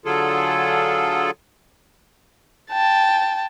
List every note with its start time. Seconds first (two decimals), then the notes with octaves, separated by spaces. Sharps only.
0.05 D3 F#3 F4 G#4 A4
2.71 G5 A5